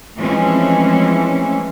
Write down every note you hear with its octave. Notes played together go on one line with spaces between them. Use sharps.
E3 F3 G#3 A3 C4 C#4